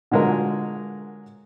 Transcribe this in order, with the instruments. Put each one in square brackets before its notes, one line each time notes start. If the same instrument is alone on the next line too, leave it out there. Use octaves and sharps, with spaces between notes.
[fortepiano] D3 F#3 G#3 F4 A#4